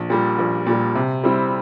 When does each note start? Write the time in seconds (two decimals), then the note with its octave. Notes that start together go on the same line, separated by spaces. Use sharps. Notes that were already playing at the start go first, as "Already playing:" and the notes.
Already playing: A#1
0.10 A#2 G3
0.38 A#1
0.66 A#2 G3
0.95 C3
1.24 G3 C4 E4